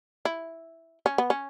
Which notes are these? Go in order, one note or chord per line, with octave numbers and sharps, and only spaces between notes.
E4
C#4
B3
C#4